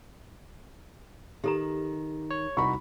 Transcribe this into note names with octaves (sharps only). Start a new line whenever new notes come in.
D#3 G4 A4 A#5
C#5
C2 D#4 F#4 B5 C#6